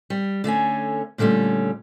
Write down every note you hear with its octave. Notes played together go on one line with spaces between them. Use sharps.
G3
D3 A3 C#4 G#5
A#2 D3 G3 A3 C#4